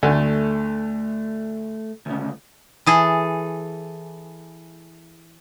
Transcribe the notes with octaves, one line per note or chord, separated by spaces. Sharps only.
D2 A3 G#5
D2 C#3
E3 G#4 A4